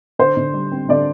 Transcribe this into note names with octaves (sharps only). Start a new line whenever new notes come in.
D3 C5
D3
G3
C4
D3 D5